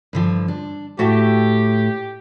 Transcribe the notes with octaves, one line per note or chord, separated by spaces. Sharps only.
G2 D3 F3
D4
A2 F#4 G4 E5 A5